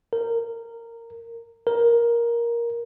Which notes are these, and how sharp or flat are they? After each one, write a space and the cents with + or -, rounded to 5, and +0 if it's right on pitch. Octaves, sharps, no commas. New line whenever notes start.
A#4 -15
A#4 +10